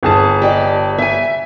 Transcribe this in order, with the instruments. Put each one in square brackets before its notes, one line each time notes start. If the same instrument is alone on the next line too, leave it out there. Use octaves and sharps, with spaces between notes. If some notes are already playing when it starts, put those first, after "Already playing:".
[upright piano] G1 G#4 A5
[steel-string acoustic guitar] G4 D5 D#5
E5 G#5